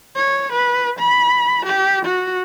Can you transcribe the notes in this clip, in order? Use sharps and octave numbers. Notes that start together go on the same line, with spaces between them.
C#5
B4
B5
G4
F#4